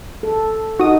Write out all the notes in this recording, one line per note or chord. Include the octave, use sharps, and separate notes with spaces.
A4
D#4 F#4 D#6